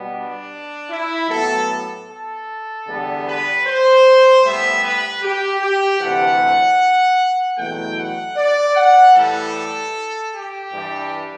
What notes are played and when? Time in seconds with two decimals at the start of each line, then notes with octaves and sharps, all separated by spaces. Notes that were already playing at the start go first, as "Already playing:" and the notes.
Already playing: B2 G3 B3
0.11 D4
0.89 E4
1.28 A2 F#3 B3 A4
2.08 A4
2.86 E2 D3 G3 B3
3.25 B4
3.64 C5
4.43 A2 G3 B3 E5
4.82 B4
5.21 G4
5.61 G4
5.99 D2 C3 E3 A3 F#5
7.57 E2 B2 F#3 A3 G5
7.96 F#5
8.35 D5
8.75 F#5
9.14 A2 E3 G3 A4
10.32 G4
10.71 G2 E3 G3